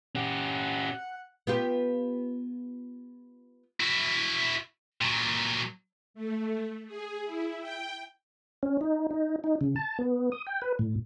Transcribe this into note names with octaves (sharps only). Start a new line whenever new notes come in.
C#4 G4 F#5
B3 F4 G4
E4 F#4
A#2 F#3
A3
G#4
E4
G5
C#4
D#4
D#4
D#4
C#3
A5
B3
D#6
G5
B4
A2